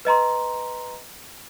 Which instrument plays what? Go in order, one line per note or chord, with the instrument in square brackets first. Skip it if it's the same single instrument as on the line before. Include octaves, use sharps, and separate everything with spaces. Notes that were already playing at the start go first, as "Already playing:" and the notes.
[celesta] B4 D#5 A#5 C6